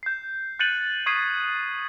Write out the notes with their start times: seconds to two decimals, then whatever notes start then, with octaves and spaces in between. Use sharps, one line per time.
0.03 G6 C7
0.59 F#6 G6 A6 C#7 D#7 F#7
1.06 C#6 D#6 G#6 B6 C7 D#7